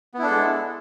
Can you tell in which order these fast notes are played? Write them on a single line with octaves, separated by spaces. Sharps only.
B3 E4 D4 A4 G#3